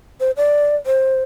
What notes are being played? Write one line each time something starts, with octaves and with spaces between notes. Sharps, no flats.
C5
D5
C5